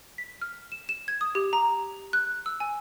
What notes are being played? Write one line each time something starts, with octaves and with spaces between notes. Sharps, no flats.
B6
F6
E7
E7
G#6
D#6
G4
A#5
F#6
E6
G#5